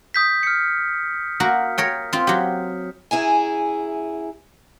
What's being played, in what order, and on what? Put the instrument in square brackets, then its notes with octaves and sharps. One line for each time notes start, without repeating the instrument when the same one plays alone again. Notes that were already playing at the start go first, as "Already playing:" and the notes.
[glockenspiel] D#6 G6 B6
F6 C#7
[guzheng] A#3 F#4 A#4
A#4 C#5 G5
C4 F4
F#3 G4
[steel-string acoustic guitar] F#2 E4 G#4 G#5